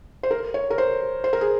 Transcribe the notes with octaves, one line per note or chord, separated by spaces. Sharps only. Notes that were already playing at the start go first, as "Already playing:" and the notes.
C5
A#4
C#5
A#4
C5
C5
A#4
G#4